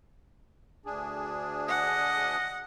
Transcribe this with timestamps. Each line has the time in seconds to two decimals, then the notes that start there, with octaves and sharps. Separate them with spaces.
0.86 D2 D4 G#4
1.68 D#5 F#5